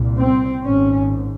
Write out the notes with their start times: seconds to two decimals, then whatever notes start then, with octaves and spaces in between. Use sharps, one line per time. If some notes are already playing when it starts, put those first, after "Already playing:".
Already playing: C2 A#2
0.17 C4
0.64 G#1 G#2 C#4